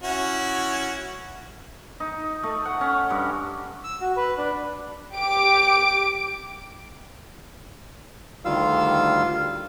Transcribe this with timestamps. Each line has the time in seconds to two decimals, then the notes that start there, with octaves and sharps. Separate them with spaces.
0.04 C#4 E4 F#4
2.00 D#4
2.43 A3
2.65 F#5
2.81 C#4
3.10 G2
3.84 E6
4.01 F#4
4.17 B4
4.38 D4
5.14 G4 D6 D7
8.45 D2 D#3 G3 F4 F5 E6